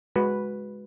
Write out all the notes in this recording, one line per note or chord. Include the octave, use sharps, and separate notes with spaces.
G#3 F#4 B4